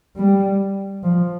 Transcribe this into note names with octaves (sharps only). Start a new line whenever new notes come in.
G3
F3